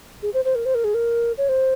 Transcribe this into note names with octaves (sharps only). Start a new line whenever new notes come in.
G#4
C5
C5
A#4
C5
A#4
G#4
A#4
C#5
C5